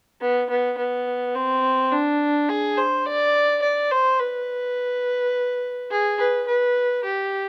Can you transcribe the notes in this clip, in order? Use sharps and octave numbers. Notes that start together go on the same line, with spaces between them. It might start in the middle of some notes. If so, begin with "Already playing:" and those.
B3
B3
B3
C4
D4
G#4
C5
D5
D5
C5
B4
G#4
B4
B4
G4